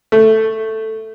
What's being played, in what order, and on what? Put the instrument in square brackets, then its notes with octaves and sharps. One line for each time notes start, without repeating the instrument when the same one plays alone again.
[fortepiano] A3